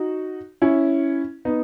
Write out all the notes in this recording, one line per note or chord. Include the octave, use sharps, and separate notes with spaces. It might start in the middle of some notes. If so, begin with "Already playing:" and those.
Already playing: D#4 F#4
C#4 E4
B3 D#4